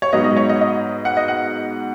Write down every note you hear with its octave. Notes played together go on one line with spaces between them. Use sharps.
C#5
G#2 F#3 B3 D#5
D#5
C#5
D#5
D#5
F#5
D#5
F#5